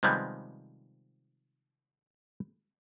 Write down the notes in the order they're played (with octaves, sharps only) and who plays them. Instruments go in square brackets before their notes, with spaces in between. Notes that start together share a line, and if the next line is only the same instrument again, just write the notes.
[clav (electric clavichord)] C3 D#3 F3 G3 G#3 B3